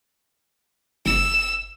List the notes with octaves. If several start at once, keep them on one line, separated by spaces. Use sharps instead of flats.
F#1 E6